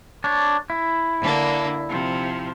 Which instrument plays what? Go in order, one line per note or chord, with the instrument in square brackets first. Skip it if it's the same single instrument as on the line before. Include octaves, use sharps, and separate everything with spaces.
[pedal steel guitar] D4 C#5
E4
[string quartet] D3 A#3 D4
C3 F3